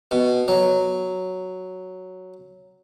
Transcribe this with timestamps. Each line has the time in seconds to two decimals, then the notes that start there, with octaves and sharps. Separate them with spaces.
0.11 B2
0.48 F#3